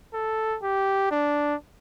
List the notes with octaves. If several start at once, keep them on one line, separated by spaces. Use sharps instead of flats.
A4
G4
D4